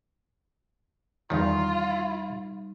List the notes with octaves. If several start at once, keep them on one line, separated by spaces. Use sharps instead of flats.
E2 D#3 G3 D#4 F4 A#4